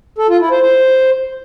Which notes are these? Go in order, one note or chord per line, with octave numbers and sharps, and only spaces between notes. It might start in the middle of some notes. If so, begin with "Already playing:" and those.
A4
F4
E4
C5
C5